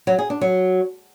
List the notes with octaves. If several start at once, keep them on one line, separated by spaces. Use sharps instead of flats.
F#3
G#4
D4
F#3